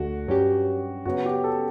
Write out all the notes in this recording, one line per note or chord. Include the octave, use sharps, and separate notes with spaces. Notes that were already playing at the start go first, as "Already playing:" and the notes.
Already playing: D2 D3 A3 F#4
G2 F#3 C#4 G4
F#2 C#3 F#3 B3 F#4
G4
A4